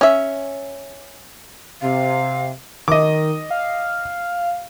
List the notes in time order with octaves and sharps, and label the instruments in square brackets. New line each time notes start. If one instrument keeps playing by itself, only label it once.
[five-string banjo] C#4 E5
[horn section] C3 [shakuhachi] F5
[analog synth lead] D#3 [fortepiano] D#5 D6
[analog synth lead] F5